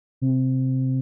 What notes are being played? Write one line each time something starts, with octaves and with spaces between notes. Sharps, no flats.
C3